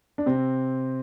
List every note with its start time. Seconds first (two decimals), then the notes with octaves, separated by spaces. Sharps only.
0.18 D4
0.26 C3 C4